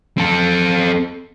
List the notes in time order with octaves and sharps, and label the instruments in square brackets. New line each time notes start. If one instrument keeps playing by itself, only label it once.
[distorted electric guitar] C4 A4